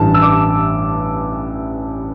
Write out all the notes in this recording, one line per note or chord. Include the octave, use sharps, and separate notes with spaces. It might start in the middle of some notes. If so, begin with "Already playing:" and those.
Already playing: A1 G2 E3 A5
E6
D6